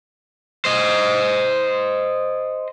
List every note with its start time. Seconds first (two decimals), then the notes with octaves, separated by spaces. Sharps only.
0.65 C5 D#5